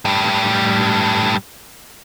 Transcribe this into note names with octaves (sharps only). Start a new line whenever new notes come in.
A2 G3